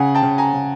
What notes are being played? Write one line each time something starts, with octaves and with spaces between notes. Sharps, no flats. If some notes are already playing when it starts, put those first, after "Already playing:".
Already playing: C#3 F#5 G#5
G5 A5
C#3
G#5 A#5
C#3